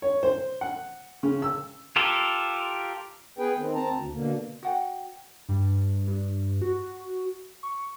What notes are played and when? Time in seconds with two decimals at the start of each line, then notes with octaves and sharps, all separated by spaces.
0.02 C#5
0.23 C5
0.61 F#5
1.23 C#3
1.42 E6
1.96 F4 G4 A4 A#4
3.38 B3 G#4 B4 G5
3.58 D#3 C4
3.75 C4 A5 A#5
3.89 D2
4.13 B2 D3 A#3
4.63 F#4 F#5 G5
5.49 G2
6.07 G2
6.62 F#4
7.63 C#6